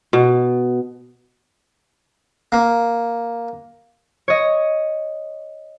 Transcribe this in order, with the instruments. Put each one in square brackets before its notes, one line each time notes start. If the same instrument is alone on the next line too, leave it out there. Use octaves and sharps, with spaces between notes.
[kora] B2
[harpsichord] A#3
[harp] C#5 D#5